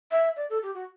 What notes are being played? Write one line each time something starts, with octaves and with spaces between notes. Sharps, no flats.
E5
D5
A4
G4
F#4